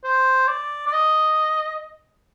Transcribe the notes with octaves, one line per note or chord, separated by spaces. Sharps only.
C5
D5
D5
D#5